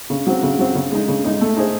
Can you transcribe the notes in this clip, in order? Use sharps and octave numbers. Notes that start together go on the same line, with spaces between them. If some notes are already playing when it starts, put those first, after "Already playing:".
C#3
F#3 C4
C#3
F#3 C4
C#3
G#3 D#4
C#3
G#3 D#4
A3
D#4 G#4 C5